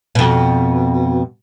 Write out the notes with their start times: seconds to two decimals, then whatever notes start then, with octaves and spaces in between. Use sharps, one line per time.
0.15 F2 B2